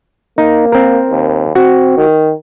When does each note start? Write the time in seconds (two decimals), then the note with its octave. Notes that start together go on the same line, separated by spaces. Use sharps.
0.38 A#3 D#4
0.72 C4 A#4
1.10 D#2
1.55 C4 F#4
1.97 D#3